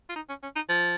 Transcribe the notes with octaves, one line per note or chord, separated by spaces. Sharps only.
F4
D#4
C#4
C#4
D#4
F3